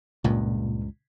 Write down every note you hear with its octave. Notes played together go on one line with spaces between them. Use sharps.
C#2 G2 A#2